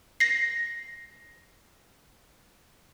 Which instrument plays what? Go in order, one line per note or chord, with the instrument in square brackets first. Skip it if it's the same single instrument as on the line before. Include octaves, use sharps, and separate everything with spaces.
[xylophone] A#6 C7